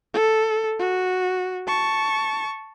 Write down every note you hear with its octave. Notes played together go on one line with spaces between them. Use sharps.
A4
F#4
A5 C#6